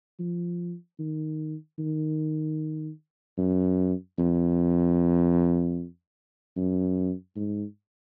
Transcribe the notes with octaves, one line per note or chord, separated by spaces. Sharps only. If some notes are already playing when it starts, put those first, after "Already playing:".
F3
D#3
D#3
F#2
F2
F#2
G#2